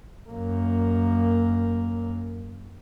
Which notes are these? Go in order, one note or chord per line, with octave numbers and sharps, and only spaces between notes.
F#2 A#3